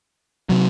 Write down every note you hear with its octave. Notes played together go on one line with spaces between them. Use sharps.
C3 F#3